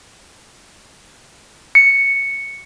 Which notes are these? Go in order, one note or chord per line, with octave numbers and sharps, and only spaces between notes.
C#7